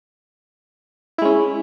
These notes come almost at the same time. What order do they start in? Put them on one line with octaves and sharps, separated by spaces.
E4 G#3 C#4